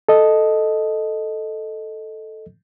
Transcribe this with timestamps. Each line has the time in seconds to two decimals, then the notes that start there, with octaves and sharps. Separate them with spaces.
0.09 A4 D#5